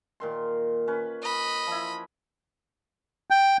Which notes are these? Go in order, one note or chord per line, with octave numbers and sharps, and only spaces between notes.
A#2 D#3 C6
C#4 B4
D#5 B5
F3 E4
G5